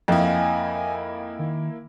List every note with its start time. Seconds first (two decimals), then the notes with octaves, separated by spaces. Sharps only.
0.08 F2 A#3 E4 D#5 F5 G5 G#5
1.39 D#3